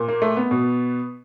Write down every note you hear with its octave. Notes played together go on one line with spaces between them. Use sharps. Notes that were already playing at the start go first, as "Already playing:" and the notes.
Already playing: A#2
A#3
A3
B3
B2